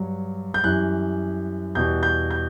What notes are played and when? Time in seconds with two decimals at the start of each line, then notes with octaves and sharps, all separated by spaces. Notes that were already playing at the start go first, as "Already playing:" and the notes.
Already playing: G2 F#3
0.54 G6
0.64 F#2 E3 G3 F#6
1.75 E2 B2 G3 G6
2.03 G6
2.30 G6